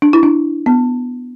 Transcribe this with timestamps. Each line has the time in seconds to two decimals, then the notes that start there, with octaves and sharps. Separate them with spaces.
0.02 D4
0.13 E4
0.23 D4
0.66 B3